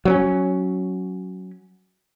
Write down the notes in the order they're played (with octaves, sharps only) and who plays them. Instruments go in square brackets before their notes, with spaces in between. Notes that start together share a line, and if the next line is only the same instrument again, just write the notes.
[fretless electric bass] F#3 C4 C#4